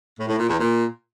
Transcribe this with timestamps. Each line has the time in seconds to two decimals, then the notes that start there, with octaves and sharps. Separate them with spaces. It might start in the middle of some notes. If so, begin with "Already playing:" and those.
0.18 A2
0.29 A2
0.39 A#2
0.50 E2
0.60 A#2